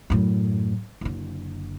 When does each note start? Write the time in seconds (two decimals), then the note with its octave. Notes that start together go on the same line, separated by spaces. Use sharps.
0.10 F#2 A2
1.01 F#1 D3